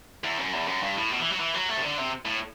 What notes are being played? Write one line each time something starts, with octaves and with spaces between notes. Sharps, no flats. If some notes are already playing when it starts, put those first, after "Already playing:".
E2
F#2
E2
F#2
G2
A2
B2
E3
F#3
E3
F#3
A3
C3
D3
C3
A2